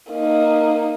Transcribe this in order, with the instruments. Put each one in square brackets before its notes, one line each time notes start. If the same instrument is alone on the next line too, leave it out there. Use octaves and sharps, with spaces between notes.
[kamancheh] A#3 D#4